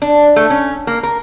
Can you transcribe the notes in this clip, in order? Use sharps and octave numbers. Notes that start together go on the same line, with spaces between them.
D4
A3
C#4
A#3
A#4